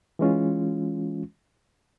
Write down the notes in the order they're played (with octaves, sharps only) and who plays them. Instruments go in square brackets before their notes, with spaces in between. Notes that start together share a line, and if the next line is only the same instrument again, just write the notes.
[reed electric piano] E3 G#3 C#4 F4